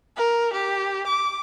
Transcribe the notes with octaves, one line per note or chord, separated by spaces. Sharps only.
A#4
G4
D6